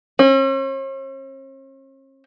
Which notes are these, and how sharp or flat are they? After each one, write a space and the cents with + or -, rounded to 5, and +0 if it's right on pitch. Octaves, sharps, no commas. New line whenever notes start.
C#4 -45